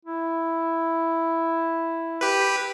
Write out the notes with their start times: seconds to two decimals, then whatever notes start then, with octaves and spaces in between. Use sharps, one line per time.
0.06 E4
2.21 G4 B4